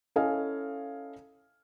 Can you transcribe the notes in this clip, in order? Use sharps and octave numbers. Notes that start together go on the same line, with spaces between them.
C#4 E4 A4 D#5 F5 G#5